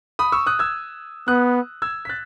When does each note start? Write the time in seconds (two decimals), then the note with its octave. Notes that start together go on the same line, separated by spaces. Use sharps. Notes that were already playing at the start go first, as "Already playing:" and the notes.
0.19 B5 D#6
0.32 C#6 E6
0.46 D#6 F#6
0.59 E6 G#6
1.28 B3 D#6 F#6
1.82 E6 G#6
2.05 B6
2.09 F#6 A6